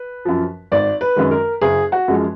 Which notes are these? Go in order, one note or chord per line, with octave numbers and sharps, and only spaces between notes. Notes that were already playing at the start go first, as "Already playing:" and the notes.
Already playing: B4
F#2 F3
G#1 D5
B4
F#2 D#3 G#3
A#4
F#1 G#4
F#4
F#2 F3 G#3